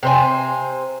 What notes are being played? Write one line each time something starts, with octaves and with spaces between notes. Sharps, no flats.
C3 C5 G#5